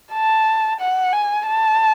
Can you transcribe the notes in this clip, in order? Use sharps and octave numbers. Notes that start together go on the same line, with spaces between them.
A5
F#5
G#5
A5